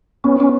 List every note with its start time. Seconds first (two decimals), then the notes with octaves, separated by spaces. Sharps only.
0.24 B3 C#4
0.40 C#4